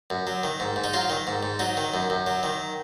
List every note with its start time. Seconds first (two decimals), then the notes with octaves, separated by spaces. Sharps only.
0.10 F#2
0.27 F#3
0.44 D#3
0.60 G#2
0.76 G#2
0.84 D#4
0.93 F#3 F4
1.10 D#3
1.27 G#2
1.43 G#2
1.59 F#3 D#4
1.77 D#3
1.94 F#2
2.10 F#2
2.27 F#3
2.43 D#3